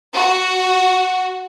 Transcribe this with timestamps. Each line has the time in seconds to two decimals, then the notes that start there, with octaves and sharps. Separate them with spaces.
0.14 F#4